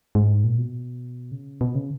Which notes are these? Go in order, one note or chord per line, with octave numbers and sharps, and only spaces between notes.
G#2
A#2
B2
C#3
B2
C#3